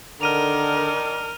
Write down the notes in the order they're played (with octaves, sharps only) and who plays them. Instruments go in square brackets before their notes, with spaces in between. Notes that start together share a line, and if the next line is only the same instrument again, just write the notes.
[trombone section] D3 [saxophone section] D#3 D4 D#4 [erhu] A#4 [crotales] F6 D#7 F7